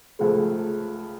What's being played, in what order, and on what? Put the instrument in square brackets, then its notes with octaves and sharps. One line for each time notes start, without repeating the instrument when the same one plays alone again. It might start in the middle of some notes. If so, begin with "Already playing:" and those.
[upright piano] C#2 C#3 F3 A3